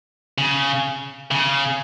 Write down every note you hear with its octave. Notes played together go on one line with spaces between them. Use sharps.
C#3
C#3